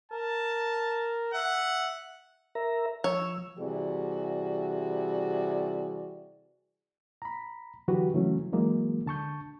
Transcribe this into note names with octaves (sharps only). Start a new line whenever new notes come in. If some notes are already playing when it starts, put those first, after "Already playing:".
A#4 A5
E5 F#5
A#4 E5 A#5
F3 C#5 E6
C3 E3 G3 F#4 G#4 D5
A#5 B5
D3 E3 F#3 F#4 G4 B4
C#3 E3 F#3 A3 C#4
E3 F#3 G#3 A#3
D3 A5 C#6 G6